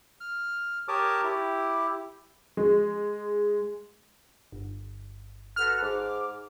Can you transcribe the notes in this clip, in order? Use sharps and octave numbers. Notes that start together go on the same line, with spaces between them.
F6
G4 A#4 C#5 A5 D6 D#6
E4 G4
G#3
G1
F#4 A4 B4 F6
G#2 D6